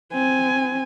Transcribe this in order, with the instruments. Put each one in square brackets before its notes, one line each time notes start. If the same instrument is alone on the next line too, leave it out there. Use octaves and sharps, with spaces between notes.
[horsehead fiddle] C4 G#5